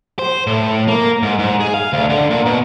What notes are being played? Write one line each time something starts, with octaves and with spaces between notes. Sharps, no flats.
C5
A2
A#3
G#2
G#2
G#4
F5
D2
D3
A#2
B2